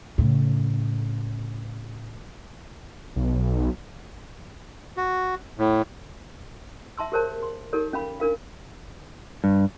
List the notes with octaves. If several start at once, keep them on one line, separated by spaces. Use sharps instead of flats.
A2 C#3
B1
F#4
A2
E5 A5 C6 E6
G4 G#4 A#4 C5 C#5 A5
C6
D#4 G4 A4 A#4 C#5
C#4 F5 B5
D4 A#4 F5
G2